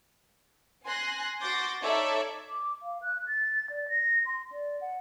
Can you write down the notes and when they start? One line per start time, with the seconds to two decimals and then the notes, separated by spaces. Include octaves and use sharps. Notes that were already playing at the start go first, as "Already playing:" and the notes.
0.85 G#5 C6 F#6 A#6
1.40 F#4 C6 D6 G6 A6 A#6
1.82 D#4 A4 C#5 D5 E5
2.50 D6
2.83 F5
3.02 F#6
3.27 A6
3.70 D5
3.89 A#6
4.26 C6
4.52 D5
4.81 F#5